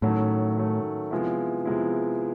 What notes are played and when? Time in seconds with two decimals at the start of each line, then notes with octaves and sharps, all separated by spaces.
0.02 A2 D#3 F#3 A3 C#4
0.58 D#3 F#3 A3 C#4
1.11 C3 F3 G#3 B3 E4
1.66 C3 F3 G#3 B3 E4